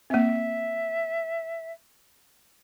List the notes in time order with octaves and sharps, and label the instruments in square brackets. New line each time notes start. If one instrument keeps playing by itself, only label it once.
[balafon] A#3 C4 [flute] E5